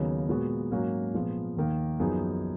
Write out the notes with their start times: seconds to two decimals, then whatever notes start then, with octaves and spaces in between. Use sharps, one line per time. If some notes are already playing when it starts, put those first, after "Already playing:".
Already playing: D#2 C#3 F#3 B3 D#4
0.29 A#2 G#3 B3 F#4
0.72 G#2 F#3 A#3 C#4 F#4
1.14 A#2 F3 G#3 B3
1.57 D#2 D#3 A#3
2.00 F#2 F3 B3 D#4 G#4